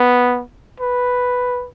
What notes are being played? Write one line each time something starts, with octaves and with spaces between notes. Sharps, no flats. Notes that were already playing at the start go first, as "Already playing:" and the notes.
Already playing: B3
B4